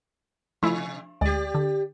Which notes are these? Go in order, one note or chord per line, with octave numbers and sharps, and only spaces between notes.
C3 F3 A3 E4
D2 G#3 G4 D5
D3